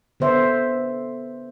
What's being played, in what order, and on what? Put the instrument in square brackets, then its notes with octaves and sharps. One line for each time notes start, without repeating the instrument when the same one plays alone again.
[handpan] D3 B3 C5 E5